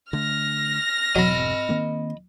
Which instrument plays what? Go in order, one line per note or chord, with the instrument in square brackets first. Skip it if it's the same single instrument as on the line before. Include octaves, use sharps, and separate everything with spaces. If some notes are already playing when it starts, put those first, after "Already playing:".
[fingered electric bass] D3 A3 [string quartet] F6 A#6
[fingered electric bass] E1 B2 [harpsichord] F#3 [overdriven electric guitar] D#5 B5
[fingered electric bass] D#3 A#3 C4